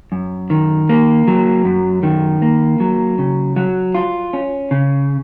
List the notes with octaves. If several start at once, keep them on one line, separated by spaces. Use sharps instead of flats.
F#2
D#3
A#3
F#3
F#2
D#3
A#3
F#3
C#3
F#3
F4
C#4
C#3